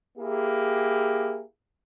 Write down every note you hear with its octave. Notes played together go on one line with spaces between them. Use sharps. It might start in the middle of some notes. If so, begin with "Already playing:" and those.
A#3 E4 G4 G#4